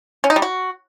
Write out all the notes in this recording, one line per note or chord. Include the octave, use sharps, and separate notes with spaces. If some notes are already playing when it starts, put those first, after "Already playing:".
C#4
D#4
G3
F#4